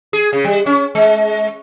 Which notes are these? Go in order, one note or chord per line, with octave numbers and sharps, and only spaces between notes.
G#4
C#3
G3
C#4
G#3